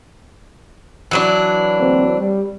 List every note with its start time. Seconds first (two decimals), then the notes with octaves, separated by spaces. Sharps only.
1.11 E3 F#3 D4
1.79 D2 A#3 C4
2.18 G3